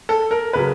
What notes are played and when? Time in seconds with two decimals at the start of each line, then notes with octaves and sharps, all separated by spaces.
0.09 A4
0.31 A#4
0.53 C#3 F#3 B4